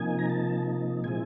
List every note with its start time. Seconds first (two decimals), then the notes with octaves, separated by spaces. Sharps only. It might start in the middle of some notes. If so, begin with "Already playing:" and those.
Already playing: C3 F3 A#3 D#4 G#5
0.19 A#5
0.30 A5
1.04 A#2 F3 G#3 C4 E4 G#5